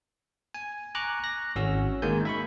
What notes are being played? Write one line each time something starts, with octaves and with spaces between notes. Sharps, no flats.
G#5
G#5 A#5 C#6 D6 F#6
F#6 A#6
G#1 C#4 F#4 E6
D#3 G#3 A#3 A#4 G#5 G6
E5 B5 C#6